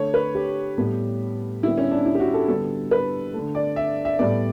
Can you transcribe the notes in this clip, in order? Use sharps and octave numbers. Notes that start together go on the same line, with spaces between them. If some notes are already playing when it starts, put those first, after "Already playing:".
Already playing: D3 A3 C#5
B4
G4
A2 G3 B3
D3 G3 B3 E4
C#4
D4
E4
G4
F#4
A4
D3 G3 B3 A4
B4
D3 A3
D5
E5
E5
A2 G3 B3 D5